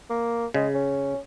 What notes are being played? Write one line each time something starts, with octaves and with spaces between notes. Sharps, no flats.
A#3
C#3 G#3
C#4